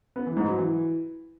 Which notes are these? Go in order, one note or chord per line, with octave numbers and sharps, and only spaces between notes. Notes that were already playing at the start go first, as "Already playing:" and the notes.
B3
E3
G#2
F#3
E3